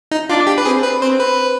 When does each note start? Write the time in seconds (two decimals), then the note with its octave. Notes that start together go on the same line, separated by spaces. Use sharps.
0.11 D#4
0.29 D4 F4
0.47 G4
0.58 B4
0.65 C4 G#4
0.83 B4
1.01 C4 C5
1.20 B4